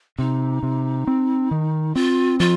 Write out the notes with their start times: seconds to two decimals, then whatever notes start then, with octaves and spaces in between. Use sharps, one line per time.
0.19 C3 D#4
0.63 C3
1.07 C4
1.51 D#3
1.95 C4 F4
2.40 F3 F4